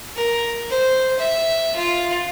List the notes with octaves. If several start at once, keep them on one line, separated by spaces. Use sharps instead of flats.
A#4
C5
E5
F4